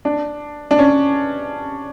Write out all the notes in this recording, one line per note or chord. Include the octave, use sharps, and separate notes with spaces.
D4
D4
C#4